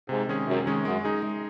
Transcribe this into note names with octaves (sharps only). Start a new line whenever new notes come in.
G#2 C3
D#3 G#3 C#4 G#4
F#2 C3
D#3 G#3 C#4 G#4
F#2 G#3
D#4 G#4
G#3